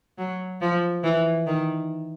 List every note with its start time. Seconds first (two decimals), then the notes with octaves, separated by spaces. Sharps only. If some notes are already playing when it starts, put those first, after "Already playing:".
0.18 F#3
0.61 F3
1.04 E3
1.47 D#3